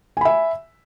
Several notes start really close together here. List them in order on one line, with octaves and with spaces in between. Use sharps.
G#5 B5 E5